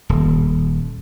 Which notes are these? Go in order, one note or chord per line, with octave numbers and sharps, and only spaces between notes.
D#1